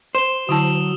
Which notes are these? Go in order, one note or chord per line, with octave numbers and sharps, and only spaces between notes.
C5 E7 G7
D3 F#3 E4 A5 D#6 E6